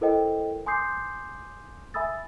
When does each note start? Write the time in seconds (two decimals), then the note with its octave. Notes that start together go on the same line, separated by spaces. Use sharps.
0.01 E4 A4 A#4 C5 D#5 G5
0.66 G#5 C6 D6 D#6 G6 C7
1.94 E5 G#5 B5 D#6 E6 A6